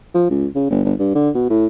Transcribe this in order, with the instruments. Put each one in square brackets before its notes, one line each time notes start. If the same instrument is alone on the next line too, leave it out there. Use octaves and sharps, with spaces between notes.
[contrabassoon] F3
C#2
C#3
G1
G1
G2
D3
B2
A2